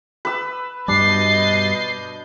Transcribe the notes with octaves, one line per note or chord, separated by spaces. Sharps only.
B4 E6
G2 B2 G3 D4 D#5 G6 A6 C7